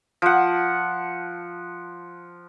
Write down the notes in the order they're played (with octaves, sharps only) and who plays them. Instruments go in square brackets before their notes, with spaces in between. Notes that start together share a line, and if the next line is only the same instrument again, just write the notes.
[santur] F3 F#5